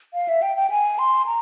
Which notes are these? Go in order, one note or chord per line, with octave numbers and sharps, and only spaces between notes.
F5
E5
G5
G5
G#5
C6
A#5